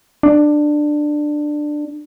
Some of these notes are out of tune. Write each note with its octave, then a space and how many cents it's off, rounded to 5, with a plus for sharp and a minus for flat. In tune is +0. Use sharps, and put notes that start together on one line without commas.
D4 +15